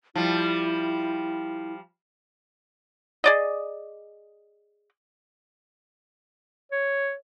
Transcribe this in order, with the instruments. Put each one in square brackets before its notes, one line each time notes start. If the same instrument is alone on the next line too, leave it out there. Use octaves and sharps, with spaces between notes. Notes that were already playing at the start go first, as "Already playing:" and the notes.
[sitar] F3 G3 [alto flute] E4
[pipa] G#4 D5 D#5
[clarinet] C#5